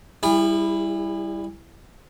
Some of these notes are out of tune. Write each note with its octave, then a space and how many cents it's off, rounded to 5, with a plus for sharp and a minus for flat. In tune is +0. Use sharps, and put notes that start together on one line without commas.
G3 +15 E4 +0 G#4 -40